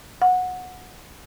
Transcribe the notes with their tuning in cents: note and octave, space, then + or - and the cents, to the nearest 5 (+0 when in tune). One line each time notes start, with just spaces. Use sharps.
F#5 -15